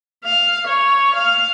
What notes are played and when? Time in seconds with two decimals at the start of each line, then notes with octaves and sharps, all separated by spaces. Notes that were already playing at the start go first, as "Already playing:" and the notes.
0.24 F5
0.68 C#5
1.15 F5